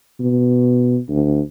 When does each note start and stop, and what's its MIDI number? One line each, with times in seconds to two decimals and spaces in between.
0.20 0.98 47
1.09 1.40 38